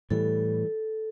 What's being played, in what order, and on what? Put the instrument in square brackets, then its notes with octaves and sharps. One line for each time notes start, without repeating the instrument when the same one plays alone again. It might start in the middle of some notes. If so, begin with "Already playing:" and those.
[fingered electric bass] A2 E3 G3 [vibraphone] A4